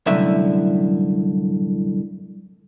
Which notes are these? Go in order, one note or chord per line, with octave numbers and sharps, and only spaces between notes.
C2 F#2 A2 D3 E5